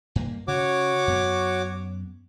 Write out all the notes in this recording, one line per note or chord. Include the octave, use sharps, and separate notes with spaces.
G2 A#3
C#3 F#4 C#5 D6
F#2 B3